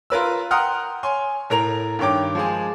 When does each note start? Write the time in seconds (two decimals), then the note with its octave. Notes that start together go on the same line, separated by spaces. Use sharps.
0.10 F4 A#4 B4 E6
0.51 F#5 G5 A#5 C6 D#6 F6
1.03 C#5 G#5 C6
1.50 A2 A#4 A#5 F7
1.99 G2 D#3 C#5 G5 D6
2.35 F3 G#3 G#4